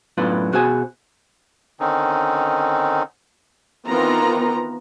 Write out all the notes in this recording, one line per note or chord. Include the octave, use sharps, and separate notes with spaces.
F#2 A2 B3 D4 F4
B2 F#4 G#4 C5 G#5
D3 D#3 C4 C#4 D#4
D#3 E3 B3 C4 F4 A#5